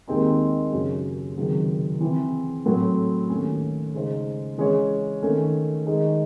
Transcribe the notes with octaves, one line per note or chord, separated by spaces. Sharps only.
D#2 D#3 G#3 C4 D#4
F#2 C#3 F#3 C#4 F#4
C#2 C3 D#3 F#3 C4
E3 C4 E4
A2 F#3 C4
D#2 D#3 A3 C#4
C#3 G#3 D#4 G#4 C5
E3 G#3 C#4 G#4 C#5
D#3 A3 C#4
D#3 G#3 D#4 G#4